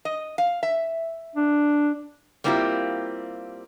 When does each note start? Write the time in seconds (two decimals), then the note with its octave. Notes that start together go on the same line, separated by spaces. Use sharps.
0.05 D#5
0.38 F5
0.63 E5
1.36 D4
2.44 G3 A#3 C4 E4 F4 G4